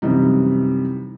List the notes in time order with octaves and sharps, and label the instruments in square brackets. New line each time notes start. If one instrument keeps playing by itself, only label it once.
[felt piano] F#2 C3 E3 G3 D#4